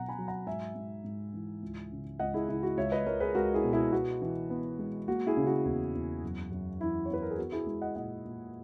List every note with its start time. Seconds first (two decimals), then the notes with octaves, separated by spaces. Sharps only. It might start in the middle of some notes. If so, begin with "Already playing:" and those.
Already playing: B2 F#3 F#5 A#5
0.09 G#5 B5
0.18 F#3
0.28 F#5 A#5
0.47 G#2 E5 G#5
0.75 G#2
1.04 G#2
1.33 E3
1.63 C#2
1.92 C#3
2.19 C#2 D#5 F#5
2.34 E4 G#4
2.49 C#3 E4
2.63 F#4
2.77 C#2 C#5 E5
2.92 B4 D#5
3.06 C#2 A#4 C#5
3.20 G#4 B4
3.35 C#2 F#4 A#4
3.54 E4 G#4
3.64 B2
3.73 E4 G#4
3.92 B3 F#4
4.22 E3
4.50 B3
4.79 G#3
5.08 A#3 F#4
5.26 E4 G#4
5.37 C#3
5.47 F#4
5.65 E2
5.95 E2
6.23 F#2
6.52 F#2
6.80 E3 E4
7.06 C#5
7.10 B3 B4
7.22 A#4
7.30 G#4
7.38 B3 F#4
7.52 E4 G#4
7.66 G#3
7.82 D#5 F#5
7.96 A#2 D#5 F#5
8.25 A#2